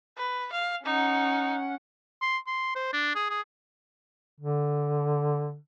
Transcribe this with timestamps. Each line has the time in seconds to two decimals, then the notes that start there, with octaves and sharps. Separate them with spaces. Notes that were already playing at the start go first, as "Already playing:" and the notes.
0.18 B4
0.52 F5
0.86 C#4 D#4 F#5
2.21 C6
2.47 C6
2.75 C5
2.93 D4
3.15 G#4
3.30 G#4
4.40 D3